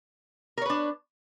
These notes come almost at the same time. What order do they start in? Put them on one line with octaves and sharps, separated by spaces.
A#4 C#5 B4 D4